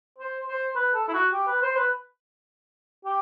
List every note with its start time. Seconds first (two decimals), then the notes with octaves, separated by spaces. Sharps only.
0.18 C5
0.48 C5
0.76 B4
0.94 A4
1.08 E4
1.14 F#4
1.33 G4
1.47 B4
1.62 C5
1.77 B4
3.05 G4